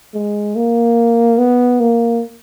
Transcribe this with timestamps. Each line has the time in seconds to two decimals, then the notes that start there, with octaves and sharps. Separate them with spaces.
0.14 G#3
0.56 A#3
1.38 B3
1.80 A#3